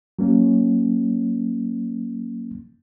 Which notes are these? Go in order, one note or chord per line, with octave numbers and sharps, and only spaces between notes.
F#3 A#3 C#4